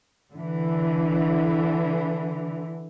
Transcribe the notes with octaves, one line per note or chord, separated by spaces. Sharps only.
D3 E3